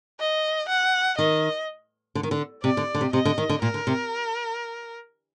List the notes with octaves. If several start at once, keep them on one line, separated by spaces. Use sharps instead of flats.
D#5
F#5
D#3 D#5
D3
D#3
D3
C3 D5
D3
D3
C3
C3 D#5
D3
D#3
D3
A#2 A#4
D3
C3